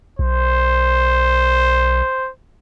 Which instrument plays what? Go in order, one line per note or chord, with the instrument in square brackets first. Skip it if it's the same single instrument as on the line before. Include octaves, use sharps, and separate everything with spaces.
[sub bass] B1 [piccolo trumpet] C5